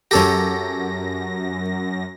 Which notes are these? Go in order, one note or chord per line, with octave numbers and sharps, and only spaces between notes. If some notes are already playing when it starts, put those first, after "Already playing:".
F#2 G4 A4 C#5 A#6